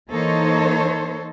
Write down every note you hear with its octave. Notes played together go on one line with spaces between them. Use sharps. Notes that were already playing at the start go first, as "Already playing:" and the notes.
E3 A#3 D#4 A4 C5 C#5